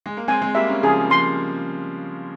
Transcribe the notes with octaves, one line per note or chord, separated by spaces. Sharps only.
G#3
A#3
G#3 C4 G#5
G#3 C4
G3 A#3 E5
A#3 C#4
C#3 F3 G#4
A#3
F3 G#3 C6